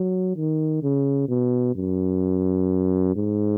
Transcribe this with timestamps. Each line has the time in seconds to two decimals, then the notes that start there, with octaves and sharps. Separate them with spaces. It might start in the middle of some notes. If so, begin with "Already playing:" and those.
Already playing: F#3
0.36 D#3
0.83 C#3
1.29 B2
1.75 F#2
3.16 G#2